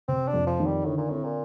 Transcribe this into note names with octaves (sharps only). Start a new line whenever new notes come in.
C3 C4
D4
F2
F3
D#3
G3
A2 D3
A#2
A2 C4
A#2